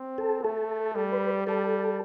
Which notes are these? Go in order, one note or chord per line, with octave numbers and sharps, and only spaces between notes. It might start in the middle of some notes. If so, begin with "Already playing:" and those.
Already playing: C4
A4
A3 A4
G3 A4
B4
G3 A4